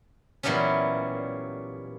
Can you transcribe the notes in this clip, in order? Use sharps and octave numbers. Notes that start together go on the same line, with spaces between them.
A#2 E3 F#3 G3 B3 C#4